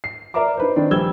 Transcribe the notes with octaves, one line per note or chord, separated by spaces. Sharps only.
C7
A#4 D5 E5 A#5 D6
D#4 B4 C5
D#3 C4 D4 C5
A#1 G3 E6 G#6 G7